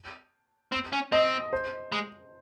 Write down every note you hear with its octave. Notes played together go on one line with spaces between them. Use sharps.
C4
C#4
C4 D#5
C5
G#3